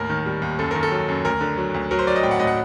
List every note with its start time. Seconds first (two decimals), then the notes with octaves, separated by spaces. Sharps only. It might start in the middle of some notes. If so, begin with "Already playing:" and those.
Already playing: D#2 A2 A#4
0.10 D#3
0.26 G3
0.42 D#2
0.59 F#2 A4
0.71 D#3 A#4
0.83 A4
0.91 F#3
1.08 F#2
1.25 D2 A#4
1.41 D3
1.58 F#3
1.74 D2
1.91 F#3 A#4
1.99 C5
2.07 F#3 D5
2.16 D#5
2.23 A2 G5
2.31 F#5
2.39 A2 D#5
2.47 F#5